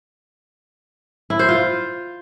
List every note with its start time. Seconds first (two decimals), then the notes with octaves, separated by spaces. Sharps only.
1.30 E4
1.39 C5
1.49 F4